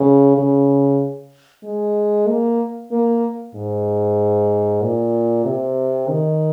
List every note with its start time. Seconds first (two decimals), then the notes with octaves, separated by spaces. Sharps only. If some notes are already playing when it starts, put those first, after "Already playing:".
Already playing: C#3
0.37 C#3
1.64 G#3
2.28 A#3
2.91 A#3
3.55 G#2
4.82 A#2
5.45 C3
6.09 D#3